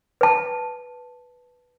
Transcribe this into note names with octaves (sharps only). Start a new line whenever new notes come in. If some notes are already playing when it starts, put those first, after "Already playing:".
B4 A5